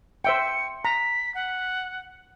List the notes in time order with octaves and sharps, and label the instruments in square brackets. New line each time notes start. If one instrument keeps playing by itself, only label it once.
[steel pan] C5 E5 G5 [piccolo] C#7
[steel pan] A#5 [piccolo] B6
[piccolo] F#5